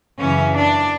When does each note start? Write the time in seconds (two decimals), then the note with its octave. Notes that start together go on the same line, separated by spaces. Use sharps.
0.19 F#2 C#3 E3 C#4
0.56 D4